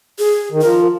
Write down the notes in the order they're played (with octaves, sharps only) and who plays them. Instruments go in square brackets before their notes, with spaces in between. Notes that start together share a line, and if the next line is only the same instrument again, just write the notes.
[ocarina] G#4
[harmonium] D#3
[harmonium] F3 [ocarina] A#4